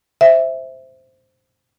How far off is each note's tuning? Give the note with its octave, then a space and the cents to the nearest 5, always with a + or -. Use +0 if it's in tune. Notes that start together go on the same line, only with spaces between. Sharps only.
C5 +0 E5 +0